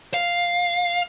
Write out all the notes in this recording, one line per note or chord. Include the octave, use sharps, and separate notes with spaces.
F5